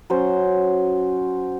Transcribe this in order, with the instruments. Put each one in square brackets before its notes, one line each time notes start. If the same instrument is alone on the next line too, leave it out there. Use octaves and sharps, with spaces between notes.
[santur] F#3 C#4 C5